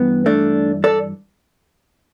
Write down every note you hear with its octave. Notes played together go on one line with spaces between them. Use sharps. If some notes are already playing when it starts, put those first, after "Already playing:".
Already playing: G2 E3 B3
A3 D4
A4 D5